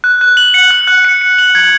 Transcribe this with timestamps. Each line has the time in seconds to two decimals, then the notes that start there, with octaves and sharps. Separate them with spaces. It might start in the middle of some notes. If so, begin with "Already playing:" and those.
0.04 F#6
0.21 F#6
0.37 F#7
0.54 C#7
0.71 F#6
0.87 F#6
1.05 C#7
1.21 C#7
1.38 F#7
1.55 G#6